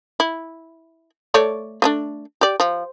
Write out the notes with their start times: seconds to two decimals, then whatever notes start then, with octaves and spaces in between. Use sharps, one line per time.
0.20 E4
1.34 A3 C#5 D5
1.82 A3 C#4 D4
2.41 G4 D5
2.60 F3